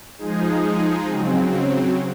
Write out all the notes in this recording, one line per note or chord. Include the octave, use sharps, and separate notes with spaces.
F3 G#3 D#4 G#4
C#3 F#3 C4